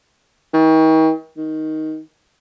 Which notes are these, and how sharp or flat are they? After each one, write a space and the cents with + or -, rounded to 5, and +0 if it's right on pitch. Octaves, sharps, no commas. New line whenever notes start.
D#3 +40
D#3 +10